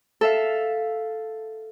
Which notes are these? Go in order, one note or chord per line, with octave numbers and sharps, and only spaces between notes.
A4 E5 F5